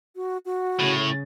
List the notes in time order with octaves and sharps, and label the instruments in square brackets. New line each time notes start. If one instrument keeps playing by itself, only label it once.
[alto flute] F#4
F#4
[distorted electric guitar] A2 [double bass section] C#3